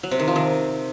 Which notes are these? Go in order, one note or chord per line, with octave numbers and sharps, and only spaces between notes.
F#3
C3
D#3
F3
D#3